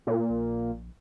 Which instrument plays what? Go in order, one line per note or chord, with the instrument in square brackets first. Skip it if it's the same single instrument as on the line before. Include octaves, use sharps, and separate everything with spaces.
[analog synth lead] A#2
[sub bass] A#1